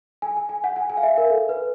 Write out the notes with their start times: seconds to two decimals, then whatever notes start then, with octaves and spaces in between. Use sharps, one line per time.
0.22 G#5
0.37 G#5
0.49 G#5
0.64 F#5
0.76 G#5
0.90 G#5
0.97 F5
1.03 E5
1.18 A#4
1.30 A4
1.49 B4